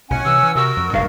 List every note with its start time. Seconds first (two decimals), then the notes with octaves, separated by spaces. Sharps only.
0.10 B1 A2 C#4 F#5 G#5
0.25 C3 E3 E6
0.43 E3
0.56 C3 F#4 A#4 E6
0.77 F2
0.93 D#1 A#1 G2 F5